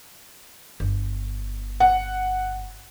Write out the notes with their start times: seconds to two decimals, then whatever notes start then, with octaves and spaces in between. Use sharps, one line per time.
0.80 G1
1.80 F#5